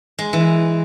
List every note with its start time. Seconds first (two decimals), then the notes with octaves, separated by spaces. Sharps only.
0.19 G#3
0.33 E3